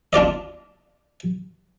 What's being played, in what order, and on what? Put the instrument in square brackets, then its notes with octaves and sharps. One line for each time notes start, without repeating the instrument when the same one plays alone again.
[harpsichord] D4 F4 D5 D#5